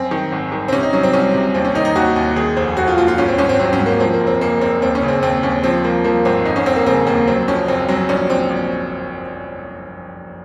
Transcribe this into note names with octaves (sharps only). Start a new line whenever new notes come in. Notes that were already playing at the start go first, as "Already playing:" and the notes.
Already playing: F#2 C4
D#3
G#1
D#3
C4
C3 C#4
D#4
F#3 C#4
C4
C2 C#4
C3
D#2 C4
C#4
D#3 D#4
D#4
D#2 F#4
D#2
D#3 G#4
F1 C5
F1 F#4
F4
D#2 F4
F4
G#1 C#4
C4
G#1 C#4
C4
F#3 C4
C#4
G#2
A#3
F3 C4
A#3
F#1
C4
F#1 A#3
F#1 C4
D#2 C4
C#4
C#3
C4
D#2 C4
D#2 C#4
F3 C4
F3 A#3
F3 A#3
G#1 C4
F1 D#4
C#4
F1 C4
A#3
C#3 C4
D#2 A#3
F#3 C4
F2 C#4
F#1 C4
F#3 C4
A#1 C#4
A#1 C4
A#1